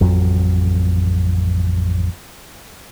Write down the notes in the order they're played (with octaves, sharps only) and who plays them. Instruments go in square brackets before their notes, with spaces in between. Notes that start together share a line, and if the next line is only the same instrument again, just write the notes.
[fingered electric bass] A1 F2 F#3